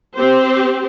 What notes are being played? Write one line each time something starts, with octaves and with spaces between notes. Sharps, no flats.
C4 G4 C5